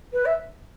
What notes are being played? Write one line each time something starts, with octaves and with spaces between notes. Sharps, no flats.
B4
E5